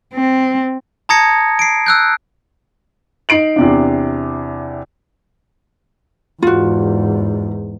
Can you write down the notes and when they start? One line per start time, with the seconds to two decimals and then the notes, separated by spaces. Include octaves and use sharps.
0.14 C4
1.09 A5 A#5 D#6 G#6 A#6 C#7
1.59 C7 D7
1.86 E6 F#6 G6
3.29 D#4 C7 D7 F#7
3.56 E2 C3 D4
6.42 E2 G#2 F4 F#4